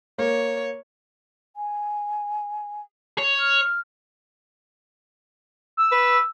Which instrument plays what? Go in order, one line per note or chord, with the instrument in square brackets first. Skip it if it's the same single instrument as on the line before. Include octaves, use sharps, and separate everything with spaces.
[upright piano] A#3 [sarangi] C#5
[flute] G#5
[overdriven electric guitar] C#5
[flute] F6
[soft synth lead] E6
[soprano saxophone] B4